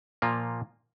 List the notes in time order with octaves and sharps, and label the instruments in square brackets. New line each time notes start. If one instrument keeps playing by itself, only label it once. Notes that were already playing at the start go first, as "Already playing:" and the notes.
[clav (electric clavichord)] A#2 F3 A#3 F4